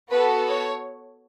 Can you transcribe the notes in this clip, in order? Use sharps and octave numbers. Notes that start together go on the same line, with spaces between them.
B3 F#4 A4 B4
C#5